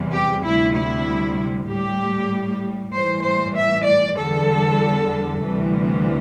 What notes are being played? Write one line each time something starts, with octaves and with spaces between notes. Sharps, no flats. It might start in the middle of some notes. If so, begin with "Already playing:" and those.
Already playing: E2 C3 E3 G3
G4
D2 C3 G3 E4
E4
A2 G3 G4
A2 E3 G3 C5
C5
E5
D5
E2 D3 G3 A4
D2 C3 E3 G3